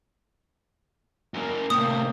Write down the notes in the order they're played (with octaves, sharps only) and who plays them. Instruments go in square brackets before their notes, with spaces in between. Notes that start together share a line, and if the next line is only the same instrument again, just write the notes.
[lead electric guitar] F#2 A#3
[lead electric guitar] A2 C3 [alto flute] A#3 [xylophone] D#6